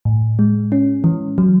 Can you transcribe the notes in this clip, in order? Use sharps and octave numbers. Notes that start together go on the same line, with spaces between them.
A2
G#3
C#4
E3
F#3